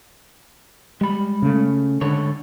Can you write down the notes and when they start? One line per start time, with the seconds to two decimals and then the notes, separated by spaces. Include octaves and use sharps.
1.01 G3 G#3 B5
1.42 C#3 A3
2.01 G#2 D3 A4 C#5